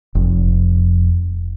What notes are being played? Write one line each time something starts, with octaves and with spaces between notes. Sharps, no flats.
F1